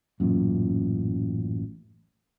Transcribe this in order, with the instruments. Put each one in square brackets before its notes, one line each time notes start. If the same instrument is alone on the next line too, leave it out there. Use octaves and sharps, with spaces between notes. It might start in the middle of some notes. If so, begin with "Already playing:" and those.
[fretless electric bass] A1 F#2 A#2